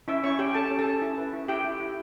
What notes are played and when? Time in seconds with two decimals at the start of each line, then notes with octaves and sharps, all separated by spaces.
0.08 C#4 E4 E5
0.24 C#4 C#5 C#6
0.39 C#4 G4 G5
0.54 C#4 A4 A5
0.71 C#4
0.79 A4 A5
0.86 C#4
1.02 E4
1.18 B4
1.33 E4
1.48 E4 G4 G5
1.64 E4
1.80 E4